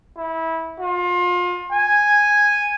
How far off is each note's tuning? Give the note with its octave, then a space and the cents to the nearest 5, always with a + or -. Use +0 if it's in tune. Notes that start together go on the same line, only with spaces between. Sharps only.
E4 -20
F4 +30
G#5 -5